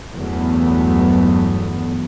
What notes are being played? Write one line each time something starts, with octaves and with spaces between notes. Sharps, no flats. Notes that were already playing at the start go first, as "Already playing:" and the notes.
E2 G2 F#3 A3 B3